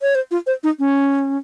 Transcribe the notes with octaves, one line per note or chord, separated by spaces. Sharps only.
C#5
C5
F4
C5
D#4
C#4